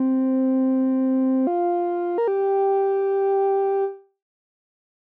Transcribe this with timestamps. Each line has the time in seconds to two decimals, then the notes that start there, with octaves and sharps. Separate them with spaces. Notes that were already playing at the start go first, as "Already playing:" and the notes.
Already playing: C4
1.47 F4
2.18 A#4
2.28 G4